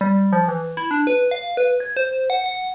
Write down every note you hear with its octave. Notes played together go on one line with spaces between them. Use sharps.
G3
F3
E3
E4
D4
B4
F5
B4
G#6
C5
F#5
F#5